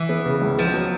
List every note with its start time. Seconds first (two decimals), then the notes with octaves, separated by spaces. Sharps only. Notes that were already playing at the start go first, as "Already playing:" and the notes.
Already playing: E3
0.09 B3
0.26 C#3
0.42 C#2
0.58 F3 B3
0.74 F#3